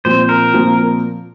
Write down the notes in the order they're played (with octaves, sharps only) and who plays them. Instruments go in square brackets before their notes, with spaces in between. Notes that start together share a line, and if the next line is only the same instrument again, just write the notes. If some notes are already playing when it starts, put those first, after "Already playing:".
[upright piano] A#2 F3 C4 [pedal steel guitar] C5
[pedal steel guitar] A#4
[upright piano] A#2 F3 C4